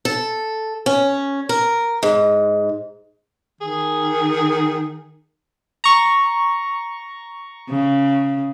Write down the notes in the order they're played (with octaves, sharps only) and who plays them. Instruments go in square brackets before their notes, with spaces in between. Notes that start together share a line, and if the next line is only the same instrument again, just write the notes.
[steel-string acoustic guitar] A4
C#4
A#4
G#2
[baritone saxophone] D#3 [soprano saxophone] G#4
[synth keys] A#5 C#6
[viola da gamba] C#3